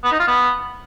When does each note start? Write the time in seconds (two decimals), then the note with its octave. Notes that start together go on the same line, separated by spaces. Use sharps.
0.04 B3
0.12 D#4
0.19 F4
0.27 B3